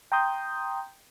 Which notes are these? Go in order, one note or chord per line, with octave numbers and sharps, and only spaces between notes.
G5 A#5 C6 D#6 G6